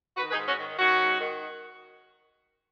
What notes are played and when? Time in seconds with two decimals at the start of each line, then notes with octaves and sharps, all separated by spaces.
0.17 D#3 F#4 B4
0.29 B4
0.32 D#4 G#4
0.38 G#2
0.48 C#4 F#4
0.58 D#3
0.79 D#3 C#4 F#4
1.00 G#2
1.20 D#3